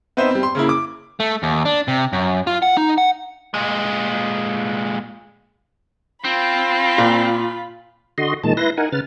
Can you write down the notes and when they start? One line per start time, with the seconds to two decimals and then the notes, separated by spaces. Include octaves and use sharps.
0.17 B3 C4 D#4 C5 E5
0.31 G3 C4
0.43 C6
0.55 C#3 A#3 E4
0.69 D6
1.20 A3
1.43 D#2
1.65 D4
1.88 C3
2.13 F#2
2.47 F4
2.63 F#5
2.77 D#4
2.98 F#5
3.54 A#2 G#3
6.24 C4 F4 B5
6.98 A#2
8.18 D3 F#4 D#5 C6
8.44 A#2 D#3 G#3 A5
8.57 E4 B4 C6 A#6
8.77 D#4 A#4 F#5 G#5
8.92 C#3 B4 F6 A6